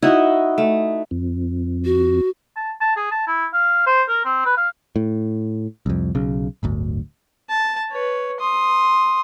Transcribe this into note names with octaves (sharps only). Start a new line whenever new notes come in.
D#4 E4 F#4 D#5
A3
F2
F#4
A5
A5
G#4
A5
E4
F5
C5
A#4
C4
B4
F5
A2
C2 F2
B1 C#3
D1 G1 D2
A5
B4 C#5
C6 D#6